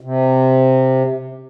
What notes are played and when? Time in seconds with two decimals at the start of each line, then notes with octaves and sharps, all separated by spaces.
0.01 C3